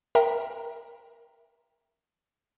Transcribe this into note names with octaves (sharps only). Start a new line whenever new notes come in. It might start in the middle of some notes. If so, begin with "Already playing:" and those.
A#4 E5 G5 A#5